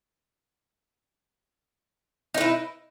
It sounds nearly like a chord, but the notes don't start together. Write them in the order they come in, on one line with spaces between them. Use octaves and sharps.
D#4 B4 E4